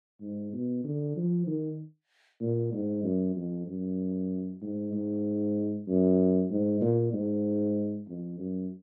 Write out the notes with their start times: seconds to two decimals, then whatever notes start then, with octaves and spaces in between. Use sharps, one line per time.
0.21 G#2
0.53 B2
0.84 D3
1.16 F3
1.47 D#3
2.41 A#2
2.73 G#2
3.04 F#2
3.36 F2
3.67 F#2
4.62 G#2
4.93 G#2
5.88 F#2
6.50 G#2
6.81 A#2
7.13 G#2
8.08 F2
8.39 F#2